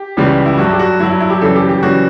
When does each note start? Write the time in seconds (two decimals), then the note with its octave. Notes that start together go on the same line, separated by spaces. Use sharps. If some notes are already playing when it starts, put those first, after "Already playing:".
Already playing: G4
0.17 C#2 C#3 E3 G3
0.46 E4
0.58 G2 F#3 F#4
0.73 G4
0.79 F#4
0.99 G2 E4
1.03 F#3
1.10 E4
1.20 E4
1.30 G4
1.41 F#2 C#3 E3 G3 A4
1.55 G4
1.69 G4
1.82 F#2 C#3 E3 G3 F#4